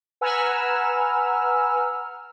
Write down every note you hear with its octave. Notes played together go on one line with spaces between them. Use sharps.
B4 F#5 G#5 A#5 E6 F6